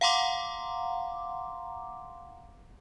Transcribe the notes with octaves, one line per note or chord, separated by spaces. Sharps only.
F5 F#5 A#5 C6 D6